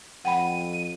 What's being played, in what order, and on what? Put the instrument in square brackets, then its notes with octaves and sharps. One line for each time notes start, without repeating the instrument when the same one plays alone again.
[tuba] F2 [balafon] F#5 G5 B5 [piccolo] D#7